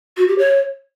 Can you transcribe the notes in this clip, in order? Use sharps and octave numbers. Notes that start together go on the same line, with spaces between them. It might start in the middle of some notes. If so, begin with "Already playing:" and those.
F#4
G4
C#5